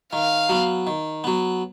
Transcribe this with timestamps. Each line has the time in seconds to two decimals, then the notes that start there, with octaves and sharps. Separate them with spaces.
0.13 D#3 F5
0.49 F#3 B3
0.87 D#3
1.24 F#3 B3